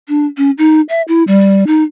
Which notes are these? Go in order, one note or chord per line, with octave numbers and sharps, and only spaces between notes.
D4
C#4
D#4
E5
E4
G3
D#4